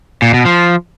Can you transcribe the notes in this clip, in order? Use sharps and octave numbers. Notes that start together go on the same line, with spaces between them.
A#2
B2
F3